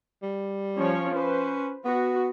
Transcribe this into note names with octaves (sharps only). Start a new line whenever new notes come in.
G3
F3 C#4 C#5
C#4 B4 C5
B3 F#4